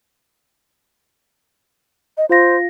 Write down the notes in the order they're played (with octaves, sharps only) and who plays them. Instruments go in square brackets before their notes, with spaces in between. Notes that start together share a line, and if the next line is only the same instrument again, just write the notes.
[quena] D#5
[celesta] F4 F5 A#6 [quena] C5